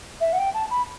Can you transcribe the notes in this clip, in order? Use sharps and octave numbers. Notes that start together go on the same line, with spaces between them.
E5
F#5
G5
A5
B5